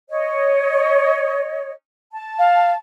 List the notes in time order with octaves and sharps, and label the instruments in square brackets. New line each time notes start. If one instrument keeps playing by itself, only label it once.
[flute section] C#5 D#5
A5
[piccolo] F5